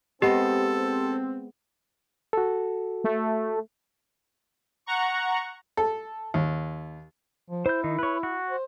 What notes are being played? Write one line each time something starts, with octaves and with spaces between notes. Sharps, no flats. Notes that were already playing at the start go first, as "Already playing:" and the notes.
G#3 B3 C4 G4 A4 D#5
F#4 A4
A3
F#5 A#5 C#6
A4
D#2
F3
E4 C5 G6
D#3 D#4
B4 C#5
F#4
C5